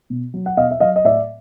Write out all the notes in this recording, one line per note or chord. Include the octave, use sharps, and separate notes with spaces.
B2
F#3
F#5
B2 D#5 F5
E5
F#3 D#5 F5
D#5
A2 D5 E5